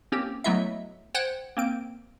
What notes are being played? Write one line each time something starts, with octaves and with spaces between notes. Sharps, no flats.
A#3 C4 C#4 G4
F#3 A3 B3 E4 D#5 E5
C5 F#5 G5 F#6 G#6
A#3 C4 D7